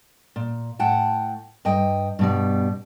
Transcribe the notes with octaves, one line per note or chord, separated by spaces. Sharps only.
A#2
A2 F#5 G5 A5
G2 D#5 G5
G2 B2 G3